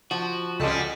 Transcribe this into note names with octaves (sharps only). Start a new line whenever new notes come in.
F3 F#4
C#2 G3 G#3 C#4 A4